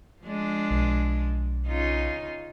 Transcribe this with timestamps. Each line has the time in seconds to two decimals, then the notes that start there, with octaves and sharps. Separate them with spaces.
0.23 F3 G#3 D4
0.71 B1
1.67 C#3 D#4 F4